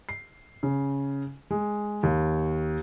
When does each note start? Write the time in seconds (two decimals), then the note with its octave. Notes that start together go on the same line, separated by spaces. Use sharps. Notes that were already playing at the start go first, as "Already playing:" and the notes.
0.09 C7
0.63 C#3
1.51 G#3
2.03 D#2